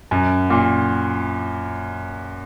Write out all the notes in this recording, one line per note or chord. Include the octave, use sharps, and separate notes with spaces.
F#2
A#2